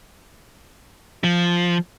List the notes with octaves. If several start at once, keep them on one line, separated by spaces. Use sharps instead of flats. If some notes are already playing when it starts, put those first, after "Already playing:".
F3